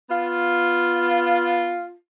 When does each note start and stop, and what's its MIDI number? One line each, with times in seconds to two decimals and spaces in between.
0.09 1.95 59
0.09 1.95 65